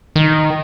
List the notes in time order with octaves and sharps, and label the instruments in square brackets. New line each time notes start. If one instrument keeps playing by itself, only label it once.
[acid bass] D#3